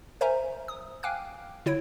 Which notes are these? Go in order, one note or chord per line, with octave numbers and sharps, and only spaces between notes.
A#4 C5 E5 G#5 A#5
D#6
F5 G5 G#5 D6 F6 F#6
D3 E4 C#5 G#6 D7